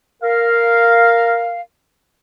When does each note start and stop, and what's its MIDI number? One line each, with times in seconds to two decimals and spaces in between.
0.23 1.60 70
0.23 1.60 77